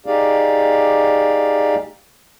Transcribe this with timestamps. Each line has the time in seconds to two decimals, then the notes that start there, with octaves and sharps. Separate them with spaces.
0.06 D#4 G4 G#4 D5 F5